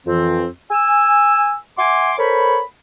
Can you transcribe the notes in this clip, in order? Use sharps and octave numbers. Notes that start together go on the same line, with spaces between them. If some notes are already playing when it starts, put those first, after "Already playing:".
F2 E3 C4
G#5 E6
E5 F#5 G#5 C6 D6
A4 A#4 C5 C#5 B5